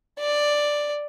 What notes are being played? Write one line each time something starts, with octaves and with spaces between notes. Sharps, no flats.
D5